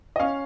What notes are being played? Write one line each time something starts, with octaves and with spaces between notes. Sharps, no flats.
D#5
C#4 F5